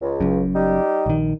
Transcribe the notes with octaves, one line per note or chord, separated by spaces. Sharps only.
C#2
F#1 F#2
G3 D#4 G4
A#1 D#3